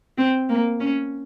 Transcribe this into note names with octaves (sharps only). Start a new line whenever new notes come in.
C4
A#3
C#4